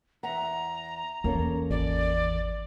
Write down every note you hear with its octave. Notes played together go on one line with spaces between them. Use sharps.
E2 E5 F#5 A#5
E2 A#3 C#4 A4
G#1 D5